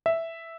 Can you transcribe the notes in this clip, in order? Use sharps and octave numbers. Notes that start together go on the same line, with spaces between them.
E5